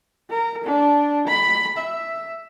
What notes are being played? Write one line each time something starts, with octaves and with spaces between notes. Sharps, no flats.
A#4
D4
B5
E5